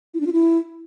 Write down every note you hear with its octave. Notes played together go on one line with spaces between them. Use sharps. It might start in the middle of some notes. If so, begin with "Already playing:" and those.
E4
D4
F4
E4